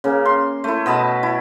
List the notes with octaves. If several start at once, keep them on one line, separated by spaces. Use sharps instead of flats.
C#3 A#3
C6
A3 E4
B2 D#5 A5 B5
E4